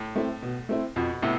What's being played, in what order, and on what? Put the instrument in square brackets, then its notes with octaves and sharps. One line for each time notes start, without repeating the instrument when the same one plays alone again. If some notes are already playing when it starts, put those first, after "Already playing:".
Already playing: [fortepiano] A2
[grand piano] A3 C4 E4
B2
A3 C4 E4
[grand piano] F2 [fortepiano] B2
[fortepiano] A2 C3 [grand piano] B3 E4